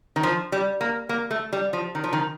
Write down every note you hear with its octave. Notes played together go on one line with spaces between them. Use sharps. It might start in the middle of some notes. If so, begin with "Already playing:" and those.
D#3
F3
G3
A#3
A#3
A3
G3
F3
D#3
F3
D#3